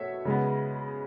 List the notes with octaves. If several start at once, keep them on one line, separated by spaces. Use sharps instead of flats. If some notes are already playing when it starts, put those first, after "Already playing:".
Already playing: B2 A3 C#5 E5
C#3 G#3 B3